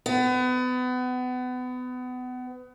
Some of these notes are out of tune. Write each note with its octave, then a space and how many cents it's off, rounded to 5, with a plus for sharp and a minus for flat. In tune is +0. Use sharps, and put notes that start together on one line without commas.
B3 +30